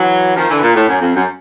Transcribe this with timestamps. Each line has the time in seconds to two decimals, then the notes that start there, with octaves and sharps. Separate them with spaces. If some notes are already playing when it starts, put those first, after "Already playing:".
Already playing: E3 F#3
0.36 D#3 F3
0.49 D3 E3
0.62 A#2
0.75 A2
0.88 F#2
1.01 F2
1.15 F#2